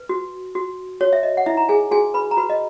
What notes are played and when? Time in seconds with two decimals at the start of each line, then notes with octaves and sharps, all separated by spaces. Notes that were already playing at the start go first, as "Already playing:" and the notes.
Already playing: B4
0.09 F#4
0.55 F#4
1.00 F#4 C#5
1.13 E5
1.23 D#5
1.37 F#5
1.46 D#4 E4 E5
1.57 A#5
1.69 G#4 G#5
1.91 F#4 G#4 G#5
2.14 B4 B5
2.31 A#5
2.37 F#4 B4 B5
2.50 D#5